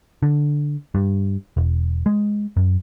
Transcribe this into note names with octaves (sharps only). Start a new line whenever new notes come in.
D3
G2
E1
G#3
F#2